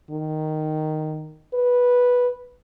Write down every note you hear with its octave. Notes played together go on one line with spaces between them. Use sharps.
D#3
B4